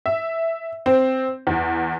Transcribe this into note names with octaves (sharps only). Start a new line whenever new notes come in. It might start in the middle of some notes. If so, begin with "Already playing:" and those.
E5
C4
E2